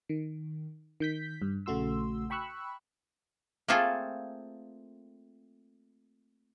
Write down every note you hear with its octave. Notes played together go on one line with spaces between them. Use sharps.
D#3
D#3 G6 B6
G2
A#1 C#3 A3 F#4 C6 E6
G5 B5 C#6 E6 F#6
A3 A#3 C4 F4 G#4 A4